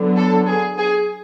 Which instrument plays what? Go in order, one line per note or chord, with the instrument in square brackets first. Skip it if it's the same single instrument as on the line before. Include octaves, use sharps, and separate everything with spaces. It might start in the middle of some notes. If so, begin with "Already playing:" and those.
Already playing: [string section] D3 F#3 B3
A4
G#4
G#4